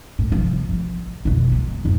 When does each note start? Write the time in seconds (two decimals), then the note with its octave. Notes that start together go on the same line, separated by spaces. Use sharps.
0.19 A2
0.32 C3 F3
0.69 A1
1.25 B1 F2
1.52 G#3 A#3
1.85 F2 G#2